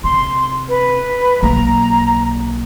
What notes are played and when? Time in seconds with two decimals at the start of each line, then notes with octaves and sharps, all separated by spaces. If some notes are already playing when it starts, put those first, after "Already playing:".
0.04 C3 C6
0.69 B4
1.42 B1 A#3 A#5